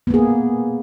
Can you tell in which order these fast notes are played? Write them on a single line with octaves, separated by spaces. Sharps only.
B3 A#3 G#4